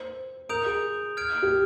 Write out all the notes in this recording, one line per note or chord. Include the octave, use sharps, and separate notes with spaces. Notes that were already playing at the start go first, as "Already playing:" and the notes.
Already playing: C5
A#4 D#6 G6 D7 F7
G#4
F6 G#6 D7
G4